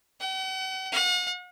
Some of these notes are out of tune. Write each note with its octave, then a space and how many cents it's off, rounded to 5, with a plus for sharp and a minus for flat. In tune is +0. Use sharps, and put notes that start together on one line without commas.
F#5 +45
F#5 -45